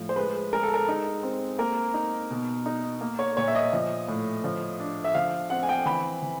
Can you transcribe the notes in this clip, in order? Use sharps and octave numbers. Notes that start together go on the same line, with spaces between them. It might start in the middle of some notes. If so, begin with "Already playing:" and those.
Already playing: A2 F3
C5
G#3 B4
G#3 A#4
A4
A#4
D#4
C4
A#3 A#4
D#4
B2
D#4
A#3
C#5
A#2 C#5
E5
D#5
F3
A2
F3
D4
E5
F3 F5
C4 F#5
G#5
G5
E3 B5
E3